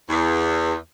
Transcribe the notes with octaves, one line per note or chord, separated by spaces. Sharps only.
E2